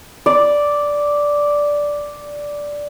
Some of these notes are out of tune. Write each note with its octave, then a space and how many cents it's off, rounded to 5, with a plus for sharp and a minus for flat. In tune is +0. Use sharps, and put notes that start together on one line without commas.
D5 -5